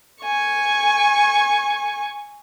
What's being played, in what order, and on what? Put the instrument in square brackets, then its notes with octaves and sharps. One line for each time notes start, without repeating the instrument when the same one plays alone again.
[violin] G#5 C#6